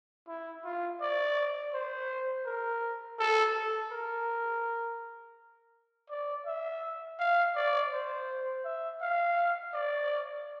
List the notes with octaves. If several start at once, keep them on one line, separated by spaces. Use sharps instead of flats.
E4
F4
D5
C5
A#4
A4
A4
A#4
D5
E5
F5
D5
C5
E5
F5
D5